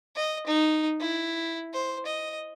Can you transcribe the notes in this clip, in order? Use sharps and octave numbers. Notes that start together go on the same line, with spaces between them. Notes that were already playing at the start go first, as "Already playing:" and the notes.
D#5
D#4
E4
C5
D#5